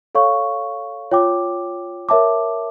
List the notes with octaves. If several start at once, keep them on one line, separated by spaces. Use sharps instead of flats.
A4 C#5 F5 C#6
F4 C#5 G5 D6
A#4 C#5 E5 A5 D6